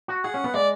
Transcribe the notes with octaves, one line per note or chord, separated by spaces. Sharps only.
F#4
G#4 F#5
C#4
B3
G#3 D5